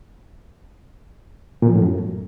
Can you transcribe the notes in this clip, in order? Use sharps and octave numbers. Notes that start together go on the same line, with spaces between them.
A#2
F3
A2
F#2